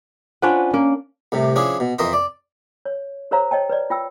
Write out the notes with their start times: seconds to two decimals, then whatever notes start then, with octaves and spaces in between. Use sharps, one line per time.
0.42 C#4 D4 F4 B4 C5 F#5
0.74 A#3 C#4
1.32 C2 A2 C3
1.56 F3 C#4 D4 E4 G#4
1.80 B2
1.98 F2 E3 A#4 D#5 E5 C6
2.13 D5
2.85 C#5
3.31 G4 A#4 C5 C#5 F5 A#5
3.51 C#5 D#5 G5 A5
3.69 B4 C#5 D5
3.90 F4 G5 E6